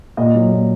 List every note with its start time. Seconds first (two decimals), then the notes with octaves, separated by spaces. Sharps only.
0.17 A#2 D#5
0.35 F#3
0.52 A#2